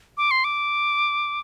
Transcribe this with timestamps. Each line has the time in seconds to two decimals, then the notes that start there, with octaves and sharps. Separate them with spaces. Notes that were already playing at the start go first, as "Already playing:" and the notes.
0.17 D6
0.31 C6
0.44 D6